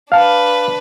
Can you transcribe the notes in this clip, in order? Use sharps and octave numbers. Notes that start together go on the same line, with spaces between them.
D4 B4 F5 A5